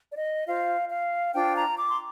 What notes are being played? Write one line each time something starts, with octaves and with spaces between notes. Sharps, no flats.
D5
D#5
F4 C5 F5
F5
D4 F4 C5 G5
A#5
D6
C6